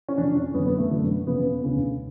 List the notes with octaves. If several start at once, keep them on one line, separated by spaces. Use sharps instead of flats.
C#4
F2 C#3 D4
C#4
F#2 D3 B3
B3
A3
F#2 D3
F2 C#3 B3
D2 C#3